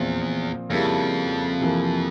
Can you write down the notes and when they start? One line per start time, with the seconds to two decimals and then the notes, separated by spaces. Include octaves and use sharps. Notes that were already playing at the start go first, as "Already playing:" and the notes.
Already playing: E2 A#2 F3 C4
0.69 F2 C#3 G3 A#3 E4
1.60 C3 E3 A#3